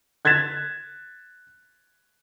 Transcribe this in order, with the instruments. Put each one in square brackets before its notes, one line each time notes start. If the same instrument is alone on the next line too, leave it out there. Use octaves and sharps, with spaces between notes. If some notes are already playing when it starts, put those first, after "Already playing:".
[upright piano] F#6 G#6 A6 B6 E7